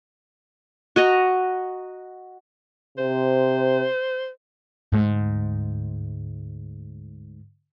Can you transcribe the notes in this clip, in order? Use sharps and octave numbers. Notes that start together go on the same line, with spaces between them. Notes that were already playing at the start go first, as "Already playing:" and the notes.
F#4 D#5 A#5
C3 C5
D2 G#2